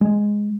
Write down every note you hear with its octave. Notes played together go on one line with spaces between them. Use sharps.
G#3